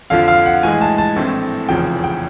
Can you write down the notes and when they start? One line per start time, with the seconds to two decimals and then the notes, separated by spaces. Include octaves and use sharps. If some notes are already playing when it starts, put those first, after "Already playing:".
0.10 F2 D3 F3 F5
0.28 F5
0.46 F#5
0.63 A2 E3 G#3 G#5
0.81 A5
0.98 A5
1.16 A#1 A2 E3 A3 C4
1.69 F1 E2 C#3 F3 G5
2.04 G5